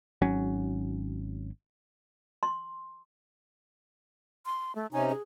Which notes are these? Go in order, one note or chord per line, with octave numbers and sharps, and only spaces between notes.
G#1 F#3 C#4
C6
C6
A3
C3 C#4 D#4 G#5
G#4